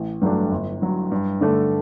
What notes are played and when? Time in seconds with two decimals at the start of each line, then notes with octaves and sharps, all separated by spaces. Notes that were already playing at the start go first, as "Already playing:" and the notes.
Already playing: A1
0.22 G2 F#3 A3 D4
0.52 G1
0.82 G2 F#3
1.11 G2
1.41 D3 A3 D4 A4